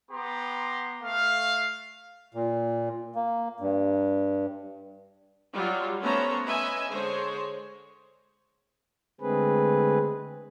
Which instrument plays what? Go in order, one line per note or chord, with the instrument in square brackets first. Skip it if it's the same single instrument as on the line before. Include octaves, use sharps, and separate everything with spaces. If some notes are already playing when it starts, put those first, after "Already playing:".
[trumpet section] B3 G4 A#5 C6
A3 F5
[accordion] A#2
A#3
G2
[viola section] F#3 G3 F4
A3 B3 C#4 C5 C#5 A#5
C#4 B4 D#5 E5 G#5
D3 G#3 G#4 C5 C#5
[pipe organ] D3 G#3 A3 C4 G#4 B4